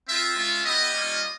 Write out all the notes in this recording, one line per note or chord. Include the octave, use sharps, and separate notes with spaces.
C4 F4 E5
G#3 C#4 F4
B3 E4 G4 D#5
G3 A#3 C#4 F4